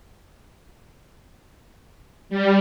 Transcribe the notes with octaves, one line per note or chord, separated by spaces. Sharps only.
G3